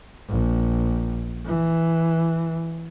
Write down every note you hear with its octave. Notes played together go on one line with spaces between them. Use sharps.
A#1
E3